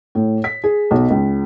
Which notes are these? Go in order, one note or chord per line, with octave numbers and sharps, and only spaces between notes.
A2
B6
G#4
B1
C#2